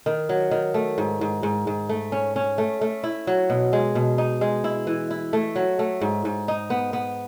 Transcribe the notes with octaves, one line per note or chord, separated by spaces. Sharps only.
D#3
F#3
D#3
A3
G#2
G#2
G#2
G#2
A3
C#4
C#4
A3
A3
E4
F#3
B2
G#3
B2
D#4
G#3
E4
E3
E4
A3
F#3
A3
G#2
G#2
D#4
B3
B3